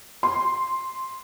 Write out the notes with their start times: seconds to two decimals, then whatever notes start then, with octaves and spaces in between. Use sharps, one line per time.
0.23 C6